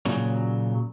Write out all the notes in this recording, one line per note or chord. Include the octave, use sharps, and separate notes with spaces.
A#2 C#3 F#3